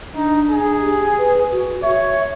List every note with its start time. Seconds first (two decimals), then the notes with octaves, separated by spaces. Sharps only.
0.15 D4 D#4
0.51 G#4
0.81 G4
1.18 B4
1.52 F#4
1.82 C#5 E5